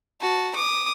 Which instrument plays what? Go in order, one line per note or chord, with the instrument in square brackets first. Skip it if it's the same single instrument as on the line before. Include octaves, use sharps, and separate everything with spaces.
[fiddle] F#4 A5
D6 D#6